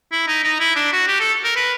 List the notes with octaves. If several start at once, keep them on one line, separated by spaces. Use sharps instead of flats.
E4
D#4
D#4
E4
D4
F#4
G4
A4
A#4
B4